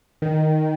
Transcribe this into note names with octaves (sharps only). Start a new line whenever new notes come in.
D#3